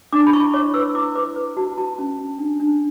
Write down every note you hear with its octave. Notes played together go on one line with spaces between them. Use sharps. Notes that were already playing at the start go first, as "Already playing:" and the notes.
D4 D6
B5
E4 C#6
C#5 D6
B4 E6
E4 D6
B4 D6
B4
F#4 A5
F#4 A5
C#4
C#4
D4
D4